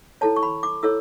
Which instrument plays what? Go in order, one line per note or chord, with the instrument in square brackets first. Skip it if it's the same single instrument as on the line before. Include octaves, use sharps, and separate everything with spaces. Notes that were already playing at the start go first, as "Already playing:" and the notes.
[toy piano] E4 A4 C#5 A5
C#6
B5
D6
E4 A4 C#5 E6